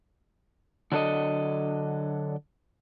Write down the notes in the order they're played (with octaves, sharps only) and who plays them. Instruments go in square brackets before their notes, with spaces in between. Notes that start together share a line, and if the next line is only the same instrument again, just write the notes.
[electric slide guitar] D3 F#3 D4 A4 D#5